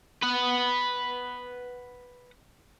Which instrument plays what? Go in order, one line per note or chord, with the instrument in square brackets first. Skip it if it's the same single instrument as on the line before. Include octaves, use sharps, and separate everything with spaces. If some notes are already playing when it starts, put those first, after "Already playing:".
[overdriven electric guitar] B4 F#5